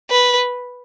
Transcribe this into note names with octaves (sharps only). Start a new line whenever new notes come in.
B4